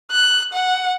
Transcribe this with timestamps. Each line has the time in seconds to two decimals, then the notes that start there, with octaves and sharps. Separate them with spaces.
0.11 F#6
0.53 F#5